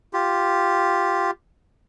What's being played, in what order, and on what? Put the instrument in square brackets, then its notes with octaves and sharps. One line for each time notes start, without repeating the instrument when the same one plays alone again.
[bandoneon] F4 G4